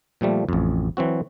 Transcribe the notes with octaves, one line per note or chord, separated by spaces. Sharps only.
A#2 F3 G3 A3
A1 F2
E3 F#3 C4 F#4